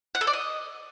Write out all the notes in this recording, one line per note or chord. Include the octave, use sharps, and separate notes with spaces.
F#5
A4
D5
D#5